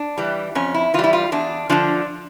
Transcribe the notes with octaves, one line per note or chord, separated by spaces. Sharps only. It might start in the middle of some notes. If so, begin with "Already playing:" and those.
Already playing: D4
E3 G3
F2 C#4
E4
E3 G3 E4 F4
F4
E2 D4
D3 F3 D4